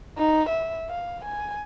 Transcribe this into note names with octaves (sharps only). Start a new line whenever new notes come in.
D#4
E5
F5
G#5